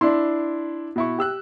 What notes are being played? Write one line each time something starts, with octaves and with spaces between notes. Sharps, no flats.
D4 E4 C6
B2 E4 C#6
G4 E6 F#6